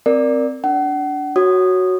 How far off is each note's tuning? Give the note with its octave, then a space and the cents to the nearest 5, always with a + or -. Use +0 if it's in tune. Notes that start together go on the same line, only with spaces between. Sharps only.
C4 +0 A#4 +0 D5 +0
D4 -20 F#5 +35
F#4 +0 C#5 +0 D#6 -15